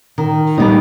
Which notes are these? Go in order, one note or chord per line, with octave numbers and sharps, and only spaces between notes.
D#3
G3 B3 D#4